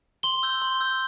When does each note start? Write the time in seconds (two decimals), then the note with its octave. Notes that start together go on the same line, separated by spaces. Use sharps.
0.23 C6 G7
0.43 E6 G6
0.62 C6
0.81 E6 G6